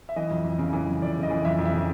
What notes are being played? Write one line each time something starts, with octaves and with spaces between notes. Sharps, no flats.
E5
E3 D#5
F2
F2
C#3
E3
F2
F2 D5
C#3
D#5
E3
F2 E5
F2
E5
C#3